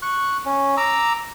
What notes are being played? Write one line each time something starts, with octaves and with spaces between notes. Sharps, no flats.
C#6 F#6
C#4
A#5 D6 E6